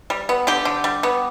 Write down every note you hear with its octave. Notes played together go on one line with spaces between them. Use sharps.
G3
B3
D3 G4
D3
G3
B3